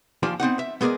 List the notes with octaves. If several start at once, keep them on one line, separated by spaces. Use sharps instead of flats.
D#2 F3 F4 D5 G#5 B5
B3 C4 D#4 F#5
E5
G#3 B3 G#4 A#4 D5 D#5